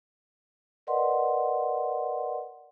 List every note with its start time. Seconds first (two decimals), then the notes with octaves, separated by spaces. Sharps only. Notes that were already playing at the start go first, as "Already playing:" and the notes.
0.87 A#4 B4 D5 D#5 F#5 C6